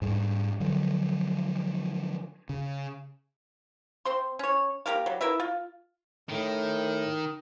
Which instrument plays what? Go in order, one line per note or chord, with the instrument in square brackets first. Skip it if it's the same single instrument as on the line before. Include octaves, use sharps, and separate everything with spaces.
[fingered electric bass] G#2 G3
D3 F3 F#3
C#3
[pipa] C4 C5 C6
C#4 C#5
A#3 G4 A#4 F5
F#3 G3
E4 A#4 B4 E5
F4
[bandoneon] A2 [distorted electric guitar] D#3